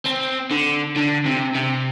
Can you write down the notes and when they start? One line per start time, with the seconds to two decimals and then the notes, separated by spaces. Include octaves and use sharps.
0.06 C4
0.51 D3
0.96 D3
1.25 C3
1.55 C3